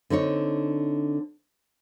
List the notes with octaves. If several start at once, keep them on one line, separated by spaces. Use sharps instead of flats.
D3 C4 D#4 C#5